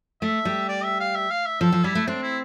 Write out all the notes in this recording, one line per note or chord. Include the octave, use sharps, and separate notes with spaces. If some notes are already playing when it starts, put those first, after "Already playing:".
A3 E5
G3
D5
E5
F5
E5
F5
E5
F3 A4
F3
G3 E4
A3
C4 D4
E4